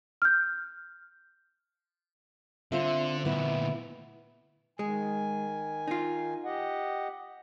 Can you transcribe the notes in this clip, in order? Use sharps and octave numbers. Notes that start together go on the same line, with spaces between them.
F6 G6
D3 C4 F4 E5
D2 A#2 B3 E4
D#3 G#3 G#5
D#4 F4
G4 D#5 F#5